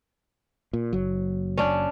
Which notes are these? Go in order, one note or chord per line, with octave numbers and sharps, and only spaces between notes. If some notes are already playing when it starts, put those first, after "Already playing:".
A#2
F#1 F#3
C#4 D4